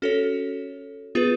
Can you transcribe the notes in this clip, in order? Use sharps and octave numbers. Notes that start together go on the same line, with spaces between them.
C#4 F#4 A4 C#5
B3 F4 G#4 B4